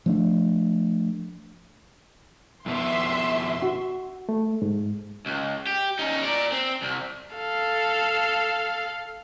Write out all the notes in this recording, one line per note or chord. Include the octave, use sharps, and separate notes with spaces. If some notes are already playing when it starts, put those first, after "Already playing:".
F3 A3 D4
F2 B2 B3 E5 C6
F#4
A3
G#2
C#2
G4
C#4 D#4
A#4 D5
C4
C2
A4 F5